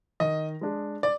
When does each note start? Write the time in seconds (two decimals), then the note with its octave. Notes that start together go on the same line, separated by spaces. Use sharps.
0.20 D#3 D#5
0.61 G#3 D4 G#4
1.03 D5